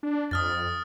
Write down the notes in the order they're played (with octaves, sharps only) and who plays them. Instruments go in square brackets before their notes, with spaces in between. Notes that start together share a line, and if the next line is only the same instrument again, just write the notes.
[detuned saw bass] D4
[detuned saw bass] F2 [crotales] D#6 F6 A6